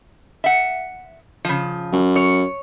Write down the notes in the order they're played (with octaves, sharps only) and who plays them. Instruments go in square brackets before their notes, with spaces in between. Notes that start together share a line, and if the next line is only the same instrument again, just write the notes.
[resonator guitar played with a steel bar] E5 F#5
C#3 F3
[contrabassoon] F#2
[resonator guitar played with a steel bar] C#5